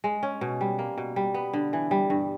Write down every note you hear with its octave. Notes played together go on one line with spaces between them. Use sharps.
G#3
C#4
B2
G3
A#3
B2
G3
B3
D3
E3
G3
G2